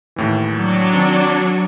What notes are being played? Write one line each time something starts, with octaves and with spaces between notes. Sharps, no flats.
D#2 A2 E3
F#3 D4
D#3 C4